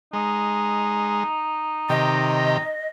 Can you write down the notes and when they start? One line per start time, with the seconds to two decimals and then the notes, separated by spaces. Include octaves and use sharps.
0.13 G#3 D#4
1.90 C3 D#3 G4 D#5